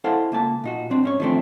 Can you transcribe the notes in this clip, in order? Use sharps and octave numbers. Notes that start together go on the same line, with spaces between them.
E4 A4 C5 F5 F#5
C#2 A#3 A5
A#2 D#4 F#4
C4 D4
G#2 C#4 C#5
D#3 F3 A3 C4 D4